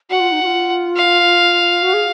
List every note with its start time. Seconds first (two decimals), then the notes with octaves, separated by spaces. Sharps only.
0.10 F#4 F#5
0.20 F4
0.32 D#4
0.42 F#4
0.46 F4
0.97 F5
1.82 F#4
1.93 G#4